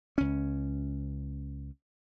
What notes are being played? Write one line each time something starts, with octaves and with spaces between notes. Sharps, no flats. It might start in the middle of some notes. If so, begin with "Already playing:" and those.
C#2 C#4